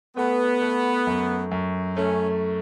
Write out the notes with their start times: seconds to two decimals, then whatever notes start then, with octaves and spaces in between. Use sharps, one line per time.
0.16 A3 B3
0.61 A3
1.07 F#2
1.51 F#2
1.96 A3 C#4